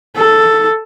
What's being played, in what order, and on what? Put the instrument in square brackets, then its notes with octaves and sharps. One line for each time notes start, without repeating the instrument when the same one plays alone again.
[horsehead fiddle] A4